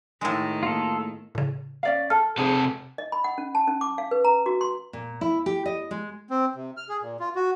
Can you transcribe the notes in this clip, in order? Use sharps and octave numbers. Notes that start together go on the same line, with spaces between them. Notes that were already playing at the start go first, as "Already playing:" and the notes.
A2 D#3 G#3
A#3 F4 A4
A2 C#3
C#4 D5 F5
A4 A5 F6
C3 G#4 A4 C5
D#5
B5
F#5
C#4
A5
C#4
D6
F5
B4
A#5
F#4
C6
A#2
E4
G4
D#5
G#3
C4
C3
F6
G#4
A#2
F4
F#4